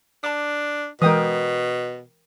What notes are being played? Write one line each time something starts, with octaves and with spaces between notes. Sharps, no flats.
D4 A5 D6
B2 E3 G#3 A#4 G5 D#6